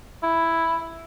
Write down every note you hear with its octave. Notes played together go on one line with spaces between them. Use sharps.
E4